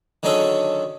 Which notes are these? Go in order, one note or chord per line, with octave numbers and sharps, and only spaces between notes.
D3 D#3 F#3 C#4 G#4 A4